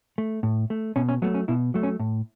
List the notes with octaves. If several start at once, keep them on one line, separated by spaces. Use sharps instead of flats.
A3
A2
A3
B2 C#4
C#4
F#3 A3 B3
C#4
B2 E4
F#3 A3
C#4
A2